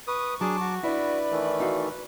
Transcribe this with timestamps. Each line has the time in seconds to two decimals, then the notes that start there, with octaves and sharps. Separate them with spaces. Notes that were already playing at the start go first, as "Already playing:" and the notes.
0.08 B4 C#6 D#6
0.41 F#3 D4 G#4 A5 D6
0.60 F#4
0.83 D4 E4 B4 D5
1.31 D#3 E3 A3
1.60 D#4 F#4 F5